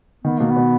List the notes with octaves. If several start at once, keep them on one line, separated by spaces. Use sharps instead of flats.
D#3 B3
B2 A#3
B3
B2